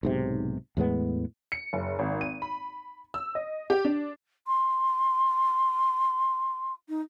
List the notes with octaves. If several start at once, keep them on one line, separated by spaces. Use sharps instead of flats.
B1 G#2 C3
E2 A2 G#3 B3
C#7
F#1
G#1
D#7
B5
E6
D#5
G4
D4
C6
D#4